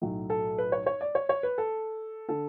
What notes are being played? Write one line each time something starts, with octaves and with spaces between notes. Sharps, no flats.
B1 A2 F#3
A4
B4
C#5
C#5
D5
C#5
C#5
B4
A4
D3 A4